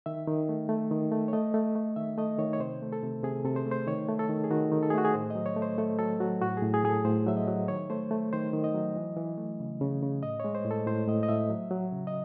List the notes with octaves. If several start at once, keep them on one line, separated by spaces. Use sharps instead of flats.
D#3 E5
D#3
A3
A3
D#3
A3
C#5
A3 D#5
A3
A3
D#3 E5
A3 D#5
D#3 C#5
C#5
C3 C5
A3
A4
C3
C3 G#4
C3 A4
C5
A3
C5
D#3 C#5
A3
A4
D#3
G#4
D#3 F#4
D#3
A4
G#4
A3 F#4
G#4
A2 C5
F#3 D#5
C#5
A3
C5
A3 A4
F#3 A4
F#3 F#4
A2 F#4
G#4
A2
G#4
A2 G#4
A4
A2 C5
F#3 E5
D#5
F#3
D#3 C#5
A3 C5
A3
D#3 C5
D#3
D#5
F#3
E3
E3
A3
C#3
C#3
C#3
A2 D#5
G#3 C#5
C5
A2
A4
A2 C5
A2 D#5
D#5
A2 E5
F#3
F#3
C#3
D#5